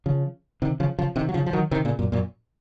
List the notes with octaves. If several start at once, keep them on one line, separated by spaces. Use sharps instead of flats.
C#3 F3
C3 D#3
C#3 F3
C#3 F3
C3 D#3
F#3
C#3 F3
F3
D#3 F#3
C3 D#3
A#2 C#3
F#2 A#2
F#2 A#2